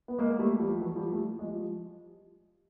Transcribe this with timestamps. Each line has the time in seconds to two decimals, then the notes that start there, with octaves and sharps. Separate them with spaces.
0.08 B3
0.19 G#3 A#3
0.39 G3 A3
0.60 F3 G3
0.81 E3 F#3
0.96 F3 G3
1.11 G3 A3
1.39 G#3
1.43 F3 G3